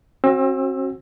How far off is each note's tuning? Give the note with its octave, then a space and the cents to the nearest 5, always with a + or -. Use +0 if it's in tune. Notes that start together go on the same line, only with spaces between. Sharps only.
C4 +40 F#4 +0 E6 +0